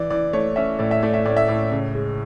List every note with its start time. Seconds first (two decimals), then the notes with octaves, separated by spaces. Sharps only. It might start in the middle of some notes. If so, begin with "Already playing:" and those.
Already playing: E3 D5
0.10 E3 D5
0.33 A3 C#5
0.56 C#4 E5
0.79 A2 D5
0.91 E5
1.03 A3 D5
1.14 E5
1.25 A2 D5
1.37 E5
1.48 A2 D5
1.72 C#2
1.95 G#3